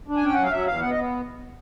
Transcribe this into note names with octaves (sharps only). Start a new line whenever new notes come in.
D4
G#5
C#4 G5
F#3 F#5
F5
F#3 E5
E2 F5
B3 F#5
D#5
B3